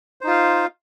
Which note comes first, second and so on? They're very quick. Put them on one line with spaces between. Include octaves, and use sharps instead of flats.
C5 D#4 F4 F5